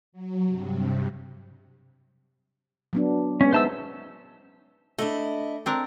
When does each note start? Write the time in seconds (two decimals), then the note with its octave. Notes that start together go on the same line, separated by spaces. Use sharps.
0.12 F#3
0.45 G2 C3
2.93 F#3 B3 D4
3.41 G#3 B3 C#4
3.53 D#4 C5 E5 A5 E6
4.98 A3 D4 E4 D#5
5.66 C4 D4 A#4